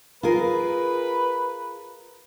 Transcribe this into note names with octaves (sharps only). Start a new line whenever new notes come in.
F4 G#4 A#4 B4